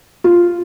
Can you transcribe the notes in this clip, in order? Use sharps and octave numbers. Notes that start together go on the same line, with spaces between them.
F4